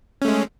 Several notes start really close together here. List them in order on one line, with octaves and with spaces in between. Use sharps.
C#4 A3 G#3